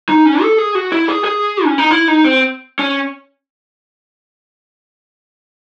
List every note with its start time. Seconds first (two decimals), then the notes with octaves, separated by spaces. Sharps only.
0.09 D#4
0.26 C#4
0.42 A4
0.58 G#4
0.75 F#4
0.92 E4
1.08 G#4
1.24 G#4
1.65 C#4
1.78 D#4
1.91 E4
2.08 D#4
2.24 C4
2.79 C#4